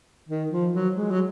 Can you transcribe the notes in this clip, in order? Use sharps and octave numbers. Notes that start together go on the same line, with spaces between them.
D#3
F3
F#3
G#3
F#3